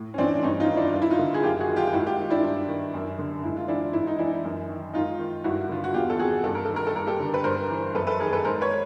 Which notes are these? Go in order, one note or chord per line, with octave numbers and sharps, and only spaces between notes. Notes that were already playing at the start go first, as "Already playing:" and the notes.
Already playing: A2
C#4
E3 C4 D4
D4
G2 C#4 D#4
D#4 F4
D#3
D4 E4
G2 F4
E4
D#4 F4
D3
G#4
F#2 F4 G4
F#4 G#4
D#3
F4 G4
G4
G#2 E4 F#4
F4 G4
D#3
D4 E4
G2
D#3
F#2
D3
G#2 E4
F4
E3 D4 E4
G#2 E4
D#4
E3 D4 E4
F#2
D#3
G#2 D#4 F4
D#3
G2 E4 F#4
D3 F4
F#4
E2 F4 G4
A4
C3 D#3 F#4 G#4
G2 A4
A#4
D#3 A4
A#4
A4
G2 A#4
G4 A4
D3
B4
G2 A#4 C5
E3
F#2 A4 B4
A4 B4
D#3 G#4 A#4
A4 B4
G#2 A#4 C5
B4 C#5